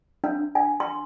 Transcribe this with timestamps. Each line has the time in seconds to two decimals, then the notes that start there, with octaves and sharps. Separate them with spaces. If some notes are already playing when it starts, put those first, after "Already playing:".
0.24 D4
0.55 G#5
0.80 C6